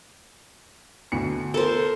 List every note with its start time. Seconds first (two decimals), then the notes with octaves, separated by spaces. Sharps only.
1.12 D2 B2 C#7
1.54 A4 A#4 C5